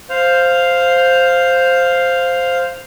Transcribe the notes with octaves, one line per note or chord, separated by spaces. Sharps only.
C5 F5